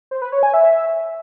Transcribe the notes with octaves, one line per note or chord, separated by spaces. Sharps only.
C5
B4
C#5
G#5
E5